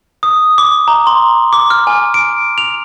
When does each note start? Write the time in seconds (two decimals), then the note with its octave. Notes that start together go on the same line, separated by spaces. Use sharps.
0.23 D#6
0.58 D6
0.88 A#5
1.07 C6
1.53 D6
1.70 F6
1.87 G#5
2.14 D7
2.58 F7